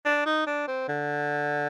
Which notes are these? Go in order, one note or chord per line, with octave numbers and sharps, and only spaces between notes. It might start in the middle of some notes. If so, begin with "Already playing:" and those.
D4
D#4
D4
C4
D3